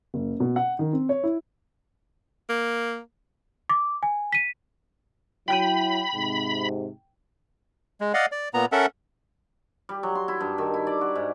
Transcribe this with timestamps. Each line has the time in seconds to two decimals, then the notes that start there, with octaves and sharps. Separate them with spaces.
0.14 F#1
0.40 B2
0.56 F#5
0.79 D#3
0.93 C4
1.09 C#5
1.23 E4
2.49 A#3
3.69 D6
4.03 G#5
4.33 B6 D#7
5.48 F#3 E4 G5 B5 G6 D#7
6.14 G#2 C3
8.01 G#3
8.14 D5 D#5 F5 F#5
8.32 D5
8.54 A#2 B3 A#5
8.72 C#4 A4 A#4 E5 F#5
9.89 G3
10.03 F#3
10.15 C6
10.28 E4
10.41 G2
10.58 D#3
10.74 E4
10.87 D5
11.01 F#4
11.15 G#2